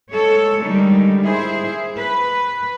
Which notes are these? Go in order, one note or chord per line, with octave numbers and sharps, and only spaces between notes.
G#3 A4 C#5
D3 D#3 G3 G#3 D#4
E4 G#4 C5
B4